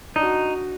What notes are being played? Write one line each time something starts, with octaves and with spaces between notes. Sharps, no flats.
D4 D#4
F#4